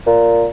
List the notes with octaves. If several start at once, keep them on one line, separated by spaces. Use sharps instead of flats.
A#2